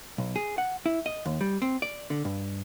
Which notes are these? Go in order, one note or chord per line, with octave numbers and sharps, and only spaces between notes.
B1
G#4
F#5
E4
D#5
D#2
G3
C4
D5
D3
G2